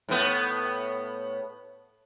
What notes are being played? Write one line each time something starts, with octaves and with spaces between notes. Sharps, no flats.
A2 B3